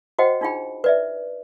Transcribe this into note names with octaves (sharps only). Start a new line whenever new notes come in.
F#4 C5 D#5 F#5 G5
D4 D#4 F4 G#4 G5 B5
B4 D5 E5